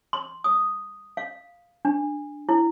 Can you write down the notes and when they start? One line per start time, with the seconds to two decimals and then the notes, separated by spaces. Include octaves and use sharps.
0.13 C6
0.44 D#6
1.17 F5
1.85 D4
2.49 E4